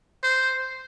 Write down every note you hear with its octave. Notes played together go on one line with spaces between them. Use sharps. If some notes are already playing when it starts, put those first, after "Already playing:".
C5